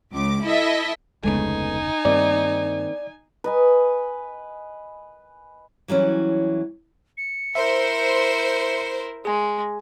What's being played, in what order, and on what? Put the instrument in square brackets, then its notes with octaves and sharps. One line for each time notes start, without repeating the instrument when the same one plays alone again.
[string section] C#2 D6
E4 A4 D#5 E5
[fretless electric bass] F1 D2 C#3 [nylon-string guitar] G#3 A3 B3 [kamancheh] D#4 G#5
[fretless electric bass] G2 [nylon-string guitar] D#3 A#3 C4 [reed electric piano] D5
[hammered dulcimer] B4 D#5 G#5
[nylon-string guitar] E3 F#3 G3 C#4
[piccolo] C#7
[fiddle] E4 A#4 [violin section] C5 [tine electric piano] E5
[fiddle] G#3 [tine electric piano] G#4 G#5